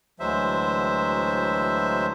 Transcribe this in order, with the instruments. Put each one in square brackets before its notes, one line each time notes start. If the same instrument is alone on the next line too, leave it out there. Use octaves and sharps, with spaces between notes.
[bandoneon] D2 E3 F#3 G#3 C5 E5